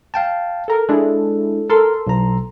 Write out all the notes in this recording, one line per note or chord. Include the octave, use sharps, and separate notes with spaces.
F5 G5 A5
A4 A#4
G#3 D4 E4 A4
A4 A#4 C6
B1 A#5